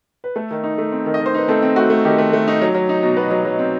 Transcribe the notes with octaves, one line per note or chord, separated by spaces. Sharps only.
B4
A3 A4
D#3
D#4
A3
C4
D#3
D#5
D#3
C5
D#4 B4
A3 C4 A4
C4
A3 F#4
A3
D#3 G4
A3
A3
D#4
F#3
F#3
D#4
B2
B2 B3 B4
F#3
F#3
C4